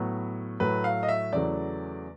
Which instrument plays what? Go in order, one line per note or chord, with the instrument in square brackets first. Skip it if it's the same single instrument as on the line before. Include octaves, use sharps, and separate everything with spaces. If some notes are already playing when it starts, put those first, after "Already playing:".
Already playing: [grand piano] A2 F#3 B3
A2 F#3 A3 B4
F5
D#5
E5
E2 C#3 F#3 A3 D5